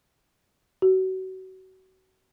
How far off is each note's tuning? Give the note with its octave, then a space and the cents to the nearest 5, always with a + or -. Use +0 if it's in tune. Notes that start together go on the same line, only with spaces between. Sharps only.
F#4 +30